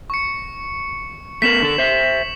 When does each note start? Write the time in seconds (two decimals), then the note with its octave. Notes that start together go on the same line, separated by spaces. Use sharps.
0.10 C#6 C#7
1.42 A3 B3 A#4 B6 E7 F#7
1.62 D3 A4
1.78 C5 E5